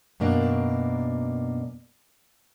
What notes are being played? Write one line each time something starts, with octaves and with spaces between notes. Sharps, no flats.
F#2 B2 A#3 D4